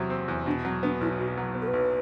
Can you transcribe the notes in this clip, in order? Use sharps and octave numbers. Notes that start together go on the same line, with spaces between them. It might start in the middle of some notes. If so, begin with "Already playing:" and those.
Already playing: E2 C3 F#3
C4
E2
B2 D4
F#3 C4
B3 D4
B1 E4
B2 F#4
F#3
B3
A4
B4
B1